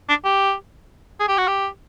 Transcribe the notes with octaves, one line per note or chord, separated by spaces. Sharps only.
D4
G4
G#4
G4
F#4
G4